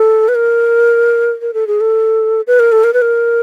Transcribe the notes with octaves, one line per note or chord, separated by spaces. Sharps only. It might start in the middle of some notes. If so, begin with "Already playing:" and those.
Already playing: A4
B4
A#4
A#4
A4
G#4
A4
B4
A#4
A4
A#4
B4
A#4